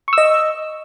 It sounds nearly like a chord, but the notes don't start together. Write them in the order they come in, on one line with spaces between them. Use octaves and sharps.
C#6 E6 D#5